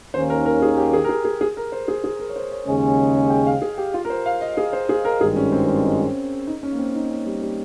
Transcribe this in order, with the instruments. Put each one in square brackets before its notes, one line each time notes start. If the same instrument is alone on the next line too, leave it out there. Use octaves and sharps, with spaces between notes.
[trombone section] D#2 D#3 A#3 C#4 [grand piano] C5
[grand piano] A#4
A#4
G#4
G4
G#4
A#4
G#4
G#4
G#4
A#4
C5
G#4
G#4
A#4
C#5
C5
C#5
[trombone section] D#2 C#3 G#3 C#4 [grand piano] D#5
[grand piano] G5
F5
G#4
G4
F4
A#4
C5
F5
D#5
G#4
C5
G#4
A#4
[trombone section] G#1 G2 D#3 G#3 [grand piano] G#4
[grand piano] C#4
C4
C#4
D#4
C#4
A#3
C4
D#4
C#4
G3
G3